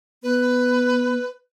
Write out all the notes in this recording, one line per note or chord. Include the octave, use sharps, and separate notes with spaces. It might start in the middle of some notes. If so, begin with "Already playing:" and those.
B3 B4